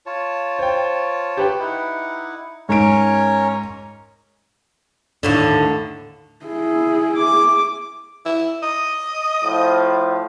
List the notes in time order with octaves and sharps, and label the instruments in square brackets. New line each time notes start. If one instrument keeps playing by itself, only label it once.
[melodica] F4 C#5 A5
[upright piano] C5 G5
G4 B4 G5
[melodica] D#4 E4 F#5
[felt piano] G#2 D7 [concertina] C#4 A#4 C#5
[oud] D#2 A2 D3
[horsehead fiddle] E4 G#4
[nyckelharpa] D6
[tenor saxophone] E4
D#5
[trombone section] A2 F3